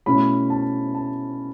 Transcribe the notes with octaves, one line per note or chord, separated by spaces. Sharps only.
B2 A3 C#4 E4 B5
A5
A5